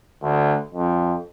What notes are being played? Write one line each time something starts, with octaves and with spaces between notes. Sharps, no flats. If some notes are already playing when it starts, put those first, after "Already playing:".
D2
F2